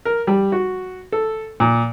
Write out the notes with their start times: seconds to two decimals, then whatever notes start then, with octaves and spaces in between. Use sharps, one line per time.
0.05 A#4
0.27 G3
0.52 F#4
1.12 A4
1.60 A#2